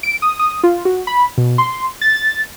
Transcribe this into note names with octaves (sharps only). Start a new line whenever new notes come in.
D7
D#6
D#6
F4
F#4
B5
B2
C6
A6
A6